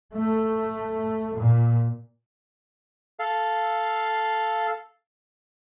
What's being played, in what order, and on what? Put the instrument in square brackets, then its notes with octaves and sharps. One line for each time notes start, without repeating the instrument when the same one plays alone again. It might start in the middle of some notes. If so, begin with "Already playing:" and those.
[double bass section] A3
A#2
[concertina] A4 F5